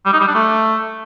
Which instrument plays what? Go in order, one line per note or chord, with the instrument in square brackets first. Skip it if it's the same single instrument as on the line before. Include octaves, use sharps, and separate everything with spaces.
[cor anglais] G3
D#4
G3
D4
A3